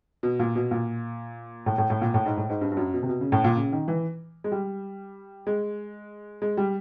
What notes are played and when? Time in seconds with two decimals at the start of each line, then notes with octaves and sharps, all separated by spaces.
0.23 B2
0.39 A#2
0.55 B2
0.71 A#2
1.66 A2
1.78 A2
1.90 A2
2.01 A#2
2.14 A2
2.26 G#2
2.38 A2
2.49 G#2
2.61 G2
2.71 G2
2.77 F#2
2.94 B2
3.03 C3
3.09 B2
3.21 C#3
3.32 A2
3.44 A#2
3.56 C#3
3.72 D#3
3.88 E3
4.44 G#3
4.52 G3
5.47 G#3
6.42 G#3
6.57 G3